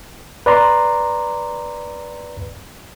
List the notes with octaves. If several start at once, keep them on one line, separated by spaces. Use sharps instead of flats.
B4 D5 A#5 C6